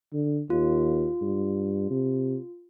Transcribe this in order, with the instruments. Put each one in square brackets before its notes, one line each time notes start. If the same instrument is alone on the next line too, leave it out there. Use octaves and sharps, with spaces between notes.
[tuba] D3
[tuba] D#2 [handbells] F4
[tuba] G2
C3